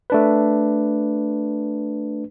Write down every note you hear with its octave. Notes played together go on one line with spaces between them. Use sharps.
A3 D4 B4